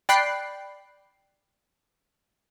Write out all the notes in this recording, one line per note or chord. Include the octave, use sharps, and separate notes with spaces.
D5 G5 B5 F#6 C7